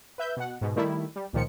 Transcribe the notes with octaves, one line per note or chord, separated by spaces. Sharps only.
B4 E5 G6
B2 F#5
G#2 B2
D#3 G3 A3 E4
G3
C#2 A#2 D#3 F3 C#7